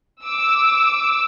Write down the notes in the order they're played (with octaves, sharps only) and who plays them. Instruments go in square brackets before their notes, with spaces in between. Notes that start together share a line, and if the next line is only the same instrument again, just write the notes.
[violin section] D6 E6